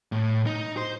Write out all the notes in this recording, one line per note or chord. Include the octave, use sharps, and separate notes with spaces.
A2
D#4
C5